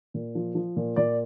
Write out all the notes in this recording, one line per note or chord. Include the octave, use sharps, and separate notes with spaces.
A#2
F3
F3
A#2
A#2 D5